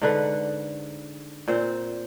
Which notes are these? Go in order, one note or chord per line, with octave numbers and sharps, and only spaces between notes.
G#2 D3 B4 F#5
A#2 C4 C5